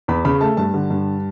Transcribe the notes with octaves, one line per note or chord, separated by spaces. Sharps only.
E2 B5
C#3 B5
A3 A5
G2 A5
D3
G2